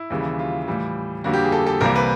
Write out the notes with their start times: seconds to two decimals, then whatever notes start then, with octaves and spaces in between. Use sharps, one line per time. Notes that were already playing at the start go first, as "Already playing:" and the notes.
Already playing: E4
0.10 D#2 C#3 E3 G3
0.39 F4
0.68 A2 E3 G3
1.24 F2 D3 G3 A#3 F#4
1.33 G4
1.44 G#4
1.52 A4
1.67 A4
1.81 C2 C3 E3 G3 A#3 A#4
1.96 B4